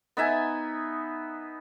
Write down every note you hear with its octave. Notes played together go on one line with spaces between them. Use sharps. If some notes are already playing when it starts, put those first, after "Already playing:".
B3 D#4 E5 G#5